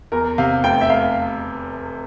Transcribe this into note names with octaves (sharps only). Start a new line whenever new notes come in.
E2 A#4
C3 F5
F1 G5
E5
F1 F5